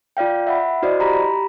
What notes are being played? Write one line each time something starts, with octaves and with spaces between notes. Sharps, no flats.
F4 D5 F5 G5
E5 F#5 B5
E4 F#4 C5 D5 D#5
G4 A#5 B5